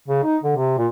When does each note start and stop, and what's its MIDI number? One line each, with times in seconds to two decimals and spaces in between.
0.08 0.23 49
0.24 0.37 63
0.43 0.55 50
0.56 0.74 48
0.78 0.87 46